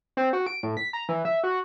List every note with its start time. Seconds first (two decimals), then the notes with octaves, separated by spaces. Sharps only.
0.17 C4
0.33 F#4
0.47 D7
0.63 A2
0.77 B6
0.93 A#5
1.09 E3
1.25 E5
1.44 F#4